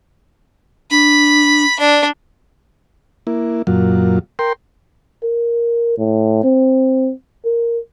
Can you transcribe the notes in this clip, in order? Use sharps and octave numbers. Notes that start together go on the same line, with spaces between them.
D4 B5
D4 D5
A#3 E4
F#2 A#2 F#3 F4
A#4 G5 C6
A#4
A2
C4
A#4